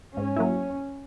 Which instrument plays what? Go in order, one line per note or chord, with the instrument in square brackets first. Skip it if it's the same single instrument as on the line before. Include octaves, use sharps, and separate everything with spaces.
[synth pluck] G#2 [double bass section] C#4
[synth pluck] F#3 A#3 E4